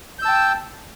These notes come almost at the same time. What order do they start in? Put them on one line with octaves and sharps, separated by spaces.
G6 E6 A5 G5